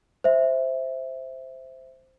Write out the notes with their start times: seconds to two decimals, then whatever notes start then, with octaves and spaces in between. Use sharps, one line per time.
0.24 C5 E5